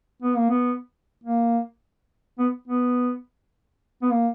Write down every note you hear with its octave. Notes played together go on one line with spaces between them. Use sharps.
B3
A#3
B3
A#3
B3
B3
B3
A#3